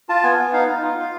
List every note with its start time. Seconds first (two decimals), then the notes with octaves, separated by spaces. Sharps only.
0.09 F4 A5
0.23 B3 G#5
0.38 B3
0.53 D#4 F5
0.68 D#4
0.83 F4
0.98 F4